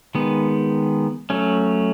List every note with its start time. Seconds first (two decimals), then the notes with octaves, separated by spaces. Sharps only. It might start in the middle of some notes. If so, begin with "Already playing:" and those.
0.15 D#3 G#3 B3
1.30 F#3 A3 C#4